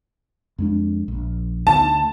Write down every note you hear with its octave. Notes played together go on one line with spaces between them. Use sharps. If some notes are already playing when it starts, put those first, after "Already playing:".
F2 G#3 D4
A#1
D2 A5